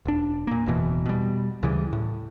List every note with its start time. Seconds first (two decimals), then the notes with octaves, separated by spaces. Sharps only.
0.05 E1 D4
0.47 A#2 A#3
0.66 F#1 E2 B2 E3
1.05 B2 G3
1.63 D2 C#3 E3 G3
1.93 A2